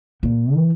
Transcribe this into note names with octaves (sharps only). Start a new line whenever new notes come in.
A#2
E3